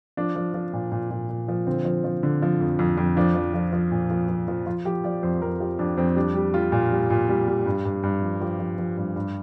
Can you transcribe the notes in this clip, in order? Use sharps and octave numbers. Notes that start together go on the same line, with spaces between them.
F3 D4
F3
F3
A#2
A#2
A#2
A#2
F3
D3 C4
F3
F3
D3
F3
F2
F2
F2
F3 D4
F3
F3
F3
A#2
F3
F3
F3
F3 F4
F3 G4
F3 D5
F2 C5
F2 A#4
F3 G4
F2 D4
F2 C4
G3 D4
G3
G3 F4
A#2
G3
A#2
G3
G3
G2
G2
G2
F3
F3 G4
F3
F3
G2
G2